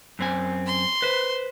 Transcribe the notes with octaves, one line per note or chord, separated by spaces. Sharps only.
F#2 C4 G#5
C6
B4 C5